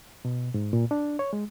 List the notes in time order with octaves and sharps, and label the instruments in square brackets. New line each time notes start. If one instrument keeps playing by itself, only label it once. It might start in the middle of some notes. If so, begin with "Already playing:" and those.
[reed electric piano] B2
G#2
A#2
D4
C#5
G#3